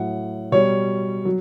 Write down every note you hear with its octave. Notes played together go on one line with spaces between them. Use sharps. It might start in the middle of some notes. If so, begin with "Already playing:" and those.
Already playing: A2 F#3 F#5
B2 G3 C#5
F#3